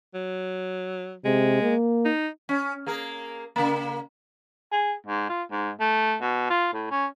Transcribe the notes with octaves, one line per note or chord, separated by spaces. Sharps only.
F#3
C3 G#3
A#3
D#4
C#4
A#3 G#4 A#4
C#3 A#3
G#4
G#2
F4
G#2
A3
B2
F4
A2
C#4